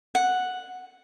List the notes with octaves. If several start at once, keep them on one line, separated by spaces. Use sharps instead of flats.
F#5